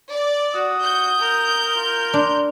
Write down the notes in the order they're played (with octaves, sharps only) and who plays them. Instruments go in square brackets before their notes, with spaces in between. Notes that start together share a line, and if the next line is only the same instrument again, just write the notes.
[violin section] D5
[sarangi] F#4 [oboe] D#6
[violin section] G6
[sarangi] A#4
[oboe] F4
[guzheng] D4 [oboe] C6